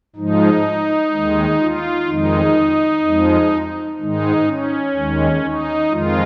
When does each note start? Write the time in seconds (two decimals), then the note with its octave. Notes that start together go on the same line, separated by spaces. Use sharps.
0.16 G#2 F3 G#3 D#4
1.12 D#2 D#3 G#3
1.59 F4
2.07 F2 D#3 G#3 D#4
3.04 F2 F3 G#3
3.98 G#2 D#3 G#3 D#4
4.46 C#4
4.95 D#2 D#3 G#3
5.42 D#4
5.90 F2 D#3 G#3 F4